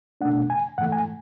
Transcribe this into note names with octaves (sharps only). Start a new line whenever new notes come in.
B2 A3 D4 F#5
G#5
G#2 E3 A3 F#5
G#5